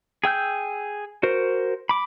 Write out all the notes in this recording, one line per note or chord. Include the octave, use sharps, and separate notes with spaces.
G#4 G5 E6 G6
F#4 A#4 C5
B5 D6